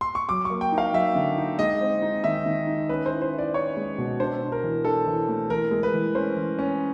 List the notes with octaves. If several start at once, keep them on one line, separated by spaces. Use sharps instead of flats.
C6
C#6
F#3 D6
A#3 C#6
G5
D#4
F5
F#3 E5
D3
D#4
G#3 D#5
C4
D#4
D#3 E5
D#3
D#4
C#4 B4
E4 C5
C5
E4
D5
C#4 C#5
G#3
B2
D4 C5
D4
A#4
E3
D4 A4
E3
A3
E3 A#4
G#3
B4
E3
C#4 C5
E3
C#4